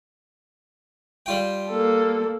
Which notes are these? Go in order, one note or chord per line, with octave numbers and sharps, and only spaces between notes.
G3 F4 G5
A#3 A4